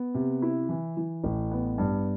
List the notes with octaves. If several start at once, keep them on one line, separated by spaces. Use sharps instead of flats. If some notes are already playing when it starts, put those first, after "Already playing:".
Already playing: B3
C3
E4
E3
E3
A1
B3
G2